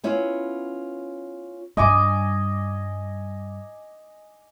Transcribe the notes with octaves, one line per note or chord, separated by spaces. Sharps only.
B3 C#4 E4 F4 B4
G2 G3 D#5 G#5 D6